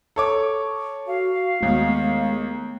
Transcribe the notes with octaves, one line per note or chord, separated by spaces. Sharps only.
A4 C#5 D6
F#4 F5
D#2 G#3 A3 B3